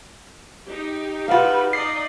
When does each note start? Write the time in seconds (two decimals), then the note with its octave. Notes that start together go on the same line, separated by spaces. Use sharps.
0.67 D#4 G4
1.28 F4 F#4 B4 F5
1.73 D#4 D5 D#5 C7